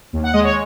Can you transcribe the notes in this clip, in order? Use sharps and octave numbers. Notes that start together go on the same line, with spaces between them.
D#2
F#5
G#3 D#5
C#5